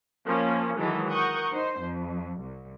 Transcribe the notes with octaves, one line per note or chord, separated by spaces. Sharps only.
F3 A#3 C#4
D#3 E3 F#3 G#3 A4
A#4 F#5 C#6 D#6 G6
D#4 C5
F2
C2